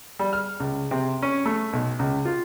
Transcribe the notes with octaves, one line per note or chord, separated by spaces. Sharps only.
G3
F6
C#2
C3
C#4
A3
B1
C#2
F4